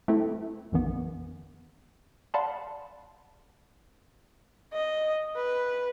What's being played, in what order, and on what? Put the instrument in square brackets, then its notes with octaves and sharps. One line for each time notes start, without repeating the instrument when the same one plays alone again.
[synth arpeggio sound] A3 C4 E4 A4
A#1 F2 D#3 E3 B3
D5 F5 F#5 A5 B5 C6
[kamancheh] D#5
B4